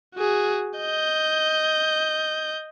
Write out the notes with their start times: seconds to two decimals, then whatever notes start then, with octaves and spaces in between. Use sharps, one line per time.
0.15 F#4 G#4
0.78 D#5 G6